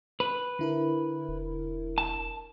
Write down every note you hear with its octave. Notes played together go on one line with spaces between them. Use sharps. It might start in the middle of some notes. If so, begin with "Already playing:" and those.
B4
D3 E4 A#4
E1
A5